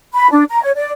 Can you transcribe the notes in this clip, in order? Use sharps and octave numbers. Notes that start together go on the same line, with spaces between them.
B5
D4
A#5
C#5
D5